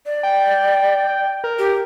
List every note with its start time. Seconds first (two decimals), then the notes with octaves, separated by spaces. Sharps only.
0.06 D5
0.23 G5
1.44 A#4
1.59 G4